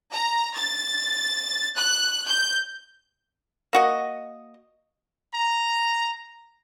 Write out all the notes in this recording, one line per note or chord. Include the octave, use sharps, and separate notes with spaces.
A#5
A6
F#6
G6
A#3 F#4 D#5
A#5